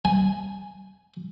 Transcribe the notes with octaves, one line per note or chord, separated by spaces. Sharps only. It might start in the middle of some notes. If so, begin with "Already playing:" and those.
G#5